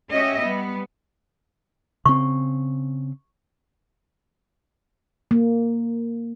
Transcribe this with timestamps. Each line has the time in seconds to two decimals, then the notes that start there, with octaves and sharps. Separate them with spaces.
0.11 C#4 F#4 G4 D#5 E5
0.43 G3 B3
2.06 C#3 C4 C#6
5.31 A#3